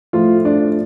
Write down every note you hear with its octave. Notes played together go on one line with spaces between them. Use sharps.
A2 F3 A3 F4
D4